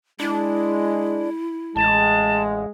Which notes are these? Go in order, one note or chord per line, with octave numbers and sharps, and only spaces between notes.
G#3 D4 E4
A1 G#3 A5